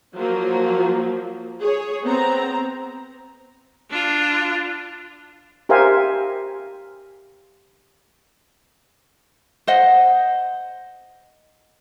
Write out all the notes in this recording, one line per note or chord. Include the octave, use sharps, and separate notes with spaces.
F3 F#3 A#3
G#4 C#5
B3 C4 A#5
D4 F4
G4 A#4 C5 E5 F5 G#5
C5 D#5 F#5